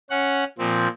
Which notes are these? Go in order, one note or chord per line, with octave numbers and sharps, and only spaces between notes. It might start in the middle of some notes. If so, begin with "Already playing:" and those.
C#4 F#5
A#2 F3 C4